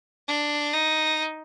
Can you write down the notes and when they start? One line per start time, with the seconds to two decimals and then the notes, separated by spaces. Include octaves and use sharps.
0.28 D4
0.74 D#4